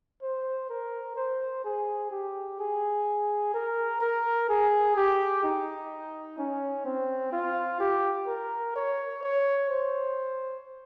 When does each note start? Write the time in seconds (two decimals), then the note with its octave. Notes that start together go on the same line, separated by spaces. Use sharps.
0.22 C5
0.69 A#4
1.16 C5
1.64 G#4
2.11 G4
2.59 G#4
3.54 A#4
4.00 A#4
4.49 G#4
4.96 G4
5.44 D#4
6.38 C#4
6.85 C4
7.33 F4
7.80 G4
8.27 A#4
8.76 C#5
9.23 C#5
9.70 C5